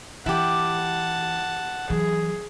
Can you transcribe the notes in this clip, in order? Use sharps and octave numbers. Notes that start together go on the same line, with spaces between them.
E3 E4 G4 F#5 A5
E3 F#3 G#4